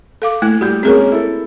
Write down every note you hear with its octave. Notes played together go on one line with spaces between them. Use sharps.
A4 F5 D6
A3 A#3 E4
G3 F#4 G6
G#3 A#3 C4 C#4 G#4 A#4
E4 A4